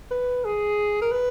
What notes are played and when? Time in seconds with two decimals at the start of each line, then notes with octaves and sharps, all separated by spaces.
0.11 B4
0.45 G#4
1.01 A#4
1.12 B4